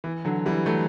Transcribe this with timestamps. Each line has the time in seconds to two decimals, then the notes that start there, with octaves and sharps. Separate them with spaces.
0.04 E3
0.25 D3 F#3
0.46 E3 G3
0.66 F#3 A3